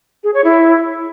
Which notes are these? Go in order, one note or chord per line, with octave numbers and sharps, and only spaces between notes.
G#4
C#5
E4